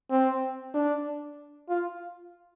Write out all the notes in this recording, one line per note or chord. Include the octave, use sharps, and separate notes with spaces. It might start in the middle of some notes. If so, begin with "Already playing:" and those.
C4
D4
F4